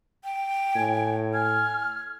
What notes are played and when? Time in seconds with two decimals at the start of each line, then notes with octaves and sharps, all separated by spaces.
0.24 G5
0.76 A2 G#5
1.34 G#5 F6